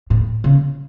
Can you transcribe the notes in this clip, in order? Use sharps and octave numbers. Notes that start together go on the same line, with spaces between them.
A2
C#3